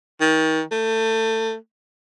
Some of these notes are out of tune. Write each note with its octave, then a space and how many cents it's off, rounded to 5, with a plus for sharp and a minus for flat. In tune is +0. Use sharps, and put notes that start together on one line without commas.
D#3 +35
A3 +25